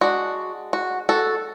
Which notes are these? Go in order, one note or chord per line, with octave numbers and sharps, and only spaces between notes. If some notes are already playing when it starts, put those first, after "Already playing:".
G#3 D4 F#4
F#4
F#4 A4